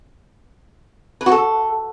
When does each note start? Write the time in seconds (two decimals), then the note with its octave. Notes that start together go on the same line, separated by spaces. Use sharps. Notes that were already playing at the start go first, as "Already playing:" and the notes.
1.21 B4
1.26 F#4
1.32 A4